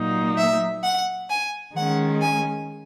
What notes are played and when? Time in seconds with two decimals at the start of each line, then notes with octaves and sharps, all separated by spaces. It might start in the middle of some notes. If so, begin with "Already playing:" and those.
Already playing: A#2 F#3 A#3 D#4
0.38 E5
0.84 F#5
1.29 G#5
1.76 D#3 G#3 C#4 F#5
2.21 G#5